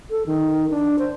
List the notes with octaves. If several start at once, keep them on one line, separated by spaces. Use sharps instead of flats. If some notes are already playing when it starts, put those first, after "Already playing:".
A4
D#3
D4
C5